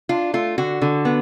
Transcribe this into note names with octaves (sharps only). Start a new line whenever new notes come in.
D4 F4
A3 F4
D3 F#4
D3
B3